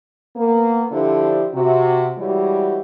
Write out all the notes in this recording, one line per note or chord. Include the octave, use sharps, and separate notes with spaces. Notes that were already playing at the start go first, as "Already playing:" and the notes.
A#3 B3
D3 F3 D4 E4 G4 C5
C3 F#4
E3 G3 G#3 F#4 G4 C#5